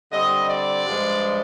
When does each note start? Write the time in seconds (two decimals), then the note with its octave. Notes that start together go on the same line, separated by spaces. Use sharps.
0.12 D3 G3 C4 D#5
0.49 D5
0.86 G2 F3 G#3